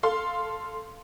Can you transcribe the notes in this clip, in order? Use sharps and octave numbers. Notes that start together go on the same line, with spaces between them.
A4 F5 C6